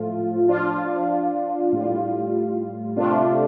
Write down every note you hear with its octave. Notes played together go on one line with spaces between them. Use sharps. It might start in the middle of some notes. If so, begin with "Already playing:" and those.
Already playing: A2 F3 A3 F4
F3 D4 F4
A2 G3 F4
C3 A3 D4 F4